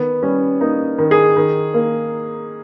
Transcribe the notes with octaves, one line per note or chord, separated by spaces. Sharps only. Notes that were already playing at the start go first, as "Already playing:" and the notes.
Already playing: D#3 B3
G3 C#4
A#3 D#4
D#3
G#4
D#3
A#3